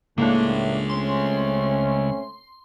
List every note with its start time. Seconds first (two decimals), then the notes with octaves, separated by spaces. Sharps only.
0.18 A2 C#3 G#3 A#3 D4
0.89 A3 C4 C#4 C6